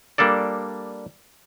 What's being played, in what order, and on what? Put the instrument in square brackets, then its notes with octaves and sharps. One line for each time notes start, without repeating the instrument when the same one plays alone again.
[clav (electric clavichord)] G3 A#3 D4 A4 D5